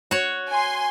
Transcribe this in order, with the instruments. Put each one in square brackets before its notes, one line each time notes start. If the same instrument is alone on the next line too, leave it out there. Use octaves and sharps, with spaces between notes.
[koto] F#4 C#5
[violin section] G#5 C6